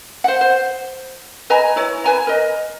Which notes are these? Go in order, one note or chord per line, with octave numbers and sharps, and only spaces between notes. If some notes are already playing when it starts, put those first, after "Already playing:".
C5 F#5
C5
B4 D#5 G#5 A#5
E4 C#5
B4 G#5 A#5
A#4 D#5